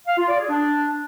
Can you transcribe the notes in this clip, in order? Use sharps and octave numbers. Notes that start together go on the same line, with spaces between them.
F5
F4
D5
G#4
D4